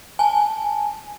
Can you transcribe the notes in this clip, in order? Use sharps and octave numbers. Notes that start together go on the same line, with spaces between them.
G#5 A5